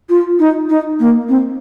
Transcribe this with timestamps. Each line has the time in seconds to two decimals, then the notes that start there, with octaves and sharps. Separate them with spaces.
0.09 F4
0.39 D#4
0.69 D#4
0.99 A#3
1.28 C4